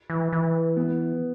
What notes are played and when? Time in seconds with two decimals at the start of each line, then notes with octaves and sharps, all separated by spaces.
0.10 E3
0.33 E3
0.76 B3